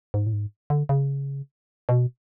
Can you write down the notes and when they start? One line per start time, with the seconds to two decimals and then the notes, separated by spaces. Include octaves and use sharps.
0.14 G#2
0.27 A2
0.33 G#2
0.70 D3
0.89 C#3
1.89 B2